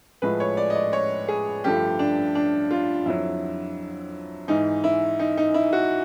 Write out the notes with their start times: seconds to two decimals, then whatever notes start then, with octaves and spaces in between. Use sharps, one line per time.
0.22 A2 F3 G#3 B4
0.40 C#5
0.57 D5
0.70 D#5
0.75 D5
0.93 C#5
1.28 G#4
1.64 G2 D3 F3 A3 G4
1.99 D4
2.35 D4
2.71 F4
3.06 F2 D3 F#3 E4
4.48 G#2 E3 G#3 D#4
4.84 E4
5.19 D#4
5.37 D#4
5.54 E4
5.73 F#4